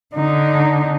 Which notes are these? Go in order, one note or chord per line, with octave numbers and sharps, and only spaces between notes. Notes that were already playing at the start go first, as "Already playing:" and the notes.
D3 D#4